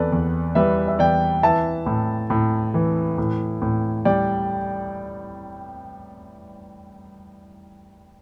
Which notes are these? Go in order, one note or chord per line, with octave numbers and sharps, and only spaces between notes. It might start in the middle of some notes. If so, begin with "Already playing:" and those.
Already playing: E2 A4 B4 D5
E2
G3 B4 E5
E5
E2 D5 G5
E3 E5 A5
A2
A2
E3
A2
A2
G3 D5 G5